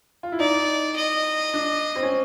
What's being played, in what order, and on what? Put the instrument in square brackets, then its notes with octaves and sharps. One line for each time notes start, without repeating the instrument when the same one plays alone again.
[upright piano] F4
E4
[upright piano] D#4 [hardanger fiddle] D5
[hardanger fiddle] D#5
[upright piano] D4
C4
C#4